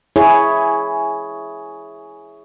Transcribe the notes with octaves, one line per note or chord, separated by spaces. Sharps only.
E4 G#4 C#5